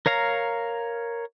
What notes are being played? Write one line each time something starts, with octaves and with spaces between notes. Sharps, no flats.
A#4 C#5 F5 A#5